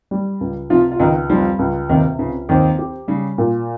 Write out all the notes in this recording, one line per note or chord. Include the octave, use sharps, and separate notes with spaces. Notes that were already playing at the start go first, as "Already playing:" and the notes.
G3
C#2
C3 F3 F4
F4
C#2 D#3 D#4
F2 F3 G3
C#2
D#2 C3 D#3
C#2 C#3
D#2 D#3 C4
G4
C#3 G3
A#2